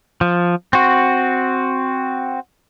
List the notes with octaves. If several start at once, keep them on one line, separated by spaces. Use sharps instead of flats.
F3
C4 F#4